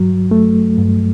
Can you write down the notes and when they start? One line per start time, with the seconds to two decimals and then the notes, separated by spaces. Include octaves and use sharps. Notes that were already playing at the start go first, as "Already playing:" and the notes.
Already playing: G2 F#3
0.31 A3
0.78 G2